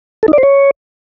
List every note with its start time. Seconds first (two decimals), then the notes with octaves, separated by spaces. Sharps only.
0.23 A4
0.28 D#4
0.33 D5
0.38 C5
0.43 C#5